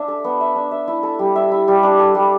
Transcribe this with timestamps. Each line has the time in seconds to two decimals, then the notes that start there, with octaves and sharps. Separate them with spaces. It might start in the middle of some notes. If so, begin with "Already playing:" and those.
Already playing: D4 E5
0.08 A4
0.24 B3
0.41 E5
0.55 D4
0.72 E5
0.88 E4
1.03 A4
1.19 G3
1.36 E5
1.52 E4
1.68 G3
1.83 D4
1.99 A4
2.15 G3